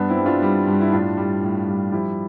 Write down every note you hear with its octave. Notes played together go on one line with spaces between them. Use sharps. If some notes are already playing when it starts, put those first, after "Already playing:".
Already playing: G2 B3 D4
C4 E4
G3
D4 F4
G3
G2
E4
A2 D4 F4
G3
A2
G3
F3 E4 G4